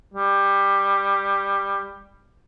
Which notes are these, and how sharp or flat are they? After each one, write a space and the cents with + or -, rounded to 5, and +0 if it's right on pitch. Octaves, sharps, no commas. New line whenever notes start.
G3 +15